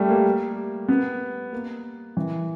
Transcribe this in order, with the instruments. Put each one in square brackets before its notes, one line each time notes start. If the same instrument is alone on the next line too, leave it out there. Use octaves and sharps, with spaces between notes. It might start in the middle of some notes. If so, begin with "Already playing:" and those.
Already playing: [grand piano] G3 A3
A#3
B3
A#3
E3